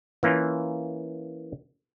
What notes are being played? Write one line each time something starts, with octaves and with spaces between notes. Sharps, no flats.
E3 A#3 C#4 F4